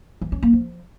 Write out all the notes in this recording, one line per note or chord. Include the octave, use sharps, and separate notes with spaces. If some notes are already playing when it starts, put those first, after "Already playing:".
E3
C#4
A#3
F3